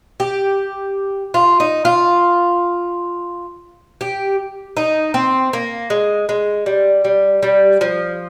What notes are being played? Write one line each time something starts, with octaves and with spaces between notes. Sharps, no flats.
G4
F4
D#4
F4
G4
D#4
C4
A#3
G#3
G#3
G3
G3
G3
F3